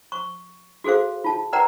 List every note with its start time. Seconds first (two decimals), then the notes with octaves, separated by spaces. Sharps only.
0.12 C#6
0.84 F#4 G#4 A4 C5 F5
1.24 F4 A5
1.53 A#4 B4 D5 F#5 G5 A#5